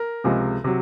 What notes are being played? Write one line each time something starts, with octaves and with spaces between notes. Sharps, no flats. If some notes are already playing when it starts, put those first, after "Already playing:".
Already playing: A#4
C#2 C3 F3 G#3
C3 F#3